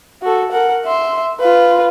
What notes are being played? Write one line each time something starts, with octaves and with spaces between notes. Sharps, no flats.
F#4 A4
A#4 F#5
E5 C6
F4 B4